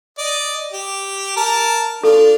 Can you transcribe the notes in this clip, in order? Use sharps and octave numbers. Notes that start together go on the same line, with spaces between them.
D5 D#5
G4
A#4 A5
D4 F4 A4